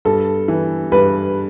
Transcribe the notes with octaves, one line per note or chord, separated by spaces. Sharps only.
G2 A4
E3
G2 B4